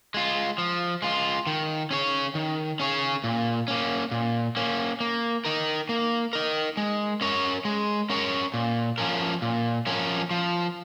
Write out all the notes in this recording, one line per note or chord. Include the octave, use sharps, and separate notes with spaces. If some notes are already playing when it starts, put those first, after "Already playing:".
G#3 F4
F3
G#3 F4
D#3
C#4 G#4 C#5
D#3
C#4 G#4 C#5
A#2
A#3 C#4
A#2
A#3 C#4
A#3
D#4 A#4
A#3
D#4 A#4
G#3
C#4 A#4 C#5
G#3
C#4 A#4 C#5
A#2
F3 C#4 A#4
A#2
F3 C#4 A#4
F3